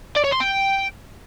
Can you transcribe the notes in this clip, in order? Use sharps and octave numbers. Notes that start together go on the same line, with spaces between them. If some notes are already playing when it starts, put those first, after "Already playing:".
D5
C#5
C6
G5